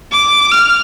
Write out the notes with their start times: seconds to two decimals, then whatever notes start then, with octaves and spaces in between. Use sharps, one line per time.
0.12 D6
0.52 F6